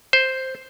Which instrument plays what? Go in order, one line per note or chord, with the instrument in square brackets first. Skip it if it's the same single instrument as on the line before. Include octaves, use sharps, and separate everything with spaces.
[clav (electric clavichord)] C5